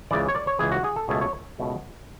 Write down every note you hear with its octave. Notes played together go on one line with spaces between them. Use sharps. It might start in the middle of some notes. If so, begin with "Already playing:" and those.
C#2 C#3 E3 D5
C#5
D5
C#5
C#2 C#3 E3 G#4
F#4
G#4
A4
C#2 B2 A3 G#4
C#5
C#2 B2 A3